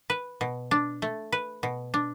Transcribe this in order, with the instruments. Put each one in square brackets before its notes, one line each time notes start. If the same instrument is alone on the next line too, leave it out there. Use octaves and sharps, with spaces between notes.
[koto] B4
B2
D4
A3
B4
B2
D4